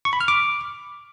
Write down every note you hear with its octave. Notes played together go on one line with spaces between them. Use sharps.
C#6
B5
F6
D6